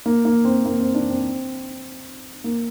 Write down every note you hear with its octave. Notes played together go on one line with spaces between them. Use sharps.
A#3
A#3
C4
A#3
C4
D4
C4
A#3